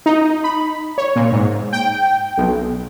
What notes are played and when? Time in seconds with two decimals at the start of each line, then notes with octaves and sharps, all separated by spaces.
0.06 D#4
0.44 B5
0.98 C#5
1.16 A#2
1.32 G#2
1.73 G5
2.38 B1